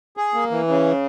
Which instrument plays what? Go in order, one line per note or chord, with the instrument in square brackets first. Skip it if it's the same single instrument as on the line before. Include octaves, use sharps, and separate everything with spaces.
[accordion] G#4
A#3
E3
C#3